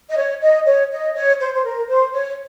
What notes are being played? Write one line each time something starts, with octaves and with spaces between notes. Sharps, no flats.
D#5
C#5
D#5
C#5
D#5
C#5
C5
C5
A#4
C5
C#5